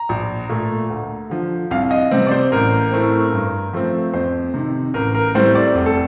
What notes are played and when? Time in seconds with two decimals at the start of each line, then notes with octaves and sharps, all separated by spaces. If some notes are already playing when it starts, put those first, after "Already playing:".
Already playing: A#5
0.09 A#1
0.49 A#2 A3
0.90 D2
1.30 D3 F3
1.71 C2 F5
1.91 D#5
2.11 C3 G3 C4
2.27 D5
2.31 C5
2.52 A1 A#4
2.91 A2 A3 C4
3.33 G2
3.73 F3 A3 C4
4.14 F2 C5
4.54 C3 D#3
4.94 A1 A#4
5.15 A#4
5.35 A2 G3 C4 C5
5.55 D5
5.75 F1
5.86 A4